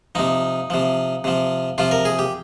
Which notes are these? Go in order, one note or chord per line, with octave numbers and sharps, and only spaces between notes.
C3 F3 D#4
C3 F3
C3 F3
C3 F3 F4
A#4
G#4
G4